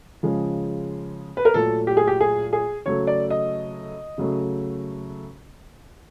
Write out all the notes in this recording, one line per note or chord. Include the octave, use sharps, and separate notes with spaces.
C#3 F3 G#3
B4
A#4
A#2 F#3 A3 A4
G4
G#4
G4
G#4
G#4
C#3 F#3 A3 C#5
D5
D#5
C#3 F#3 A3